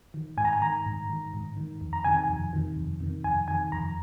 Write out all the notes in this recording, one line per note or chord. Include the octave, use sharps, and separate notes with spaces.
D#3
G#2 G#5
A#5
G#5
D#3 A#5
G#2
D#3
G#2
D#3
F2
A#5
C3 D#3 G#5
G#5
F2
C3 D#3
F2
C3 D#3
F2 G#5
C3 D#3 G#5
F2 A#5